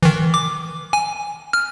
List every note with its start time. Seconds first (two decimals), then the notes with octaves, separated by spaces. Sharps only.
0.03 D#3 E3
0.34 D6
0.93 G#5
1.53 F6